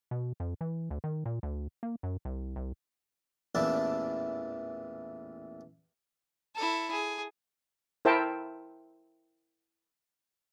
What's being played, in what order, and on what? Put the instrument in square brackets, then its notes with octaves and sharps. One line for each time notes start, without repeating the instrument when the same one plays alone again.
[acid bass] B2
F2
E3
D2
D#3
A#2
D2
A#3
F#2
C2
C2
[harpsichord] A1 E2 A#2 D4 E4 A5
[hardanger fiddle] E4 A4
G#4
[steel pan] E4 A#4 C5 E5 G5 A5